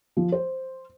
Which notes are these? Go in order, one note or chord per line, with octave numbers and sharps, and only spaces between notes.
F3
C5